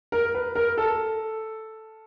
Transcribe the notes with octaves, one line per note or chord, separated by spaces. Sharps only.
A#4
B4
A#4
A4